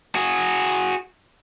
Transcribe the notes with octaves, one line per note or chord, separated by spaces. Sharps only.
F#4 G#4